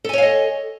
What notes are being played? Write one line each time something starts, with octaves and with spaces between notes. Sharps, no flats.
A4 C#5 D#5 F5 G#5